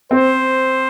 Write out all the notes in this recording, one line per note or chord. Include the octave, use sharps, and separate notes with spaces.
C4 C5